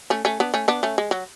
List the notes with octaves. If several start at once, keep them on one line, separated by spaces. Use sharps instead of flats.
A3 C#4
A3 C#4
B3 D4
A3 C#4
B3 D4
A3 C#4
G#3
F#3